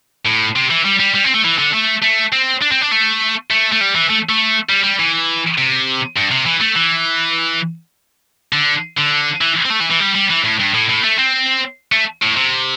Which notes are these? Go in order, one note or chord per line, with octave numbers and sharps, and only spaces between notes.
A2
C3
E3
G3
G3
G3
C4
A3
E3
D3
A3
A3
C4
D4
C4
D4
A3
A3
A3
G3
E3
A3
A3
G3
G3
E3
C3
G2
C3
E3
A3
E3
D3
D3
E3
C4
A3
E3
E3
G3
G3
E3
A2
G2
A2
A2
A3
C4
A3
A2
C3